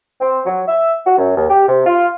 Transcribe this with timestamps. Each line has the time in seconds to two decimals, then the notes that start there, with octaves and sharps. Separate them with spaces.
0.20 C4
0.45 F#3
0.68 E5
1.05 F#4
1.18 F#2
1.36 D#2
1.49 G4
1.68 C3
1.86 F4